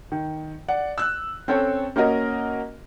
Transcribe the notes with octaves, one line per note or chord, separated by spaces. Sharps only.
D#3
D5 F#5
E6 F#6
C4 C#4 A4 C#5 G5
A#3 C#4 F#4 A#4 D#5